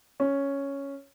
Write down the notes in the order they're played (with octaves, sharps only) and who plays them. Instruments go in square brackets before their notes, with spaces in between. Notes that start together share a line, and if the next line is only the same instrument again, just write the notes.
[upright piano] C#4